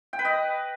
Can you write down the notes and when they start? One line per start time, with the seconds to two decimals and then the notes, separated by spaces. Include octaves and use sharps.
0.13 G5
0.19 B4
0.25 D#5